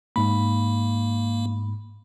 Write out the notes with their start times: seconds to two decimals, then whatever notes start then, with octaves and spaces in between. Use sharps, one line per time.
0.16 G#2 A#3 B5